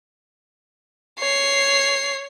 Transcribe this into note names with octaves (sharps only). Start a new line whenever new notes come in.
C#5 C7